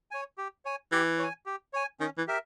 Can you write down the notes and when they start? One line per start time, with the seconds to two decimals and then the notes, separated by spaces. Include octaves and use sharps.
0.11 C#5 G#5
0.38 G4
0.65 C#5 G#5
0.92 E3 G4
1.19 C#5 G#5
1.46 G4
1.73 C#5 G#5
2.00 D#3 C#4
2.18 E3
2.27 G4 A#4 E5